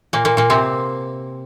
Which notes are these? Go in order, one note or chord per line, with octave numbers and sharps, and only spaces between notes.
A#2 A#3
A#2 A#3
A#2 A#3
C3 C4